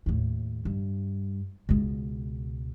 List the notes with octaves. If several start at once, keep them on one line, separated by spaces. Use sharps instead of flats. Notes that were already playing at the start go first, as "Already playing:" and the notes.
D#2 A2
G2
C#2 B2